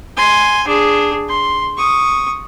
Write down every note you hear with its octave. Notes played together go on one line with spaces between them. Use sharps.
G#5 C6
D4 G#4
C6
C#6 D#6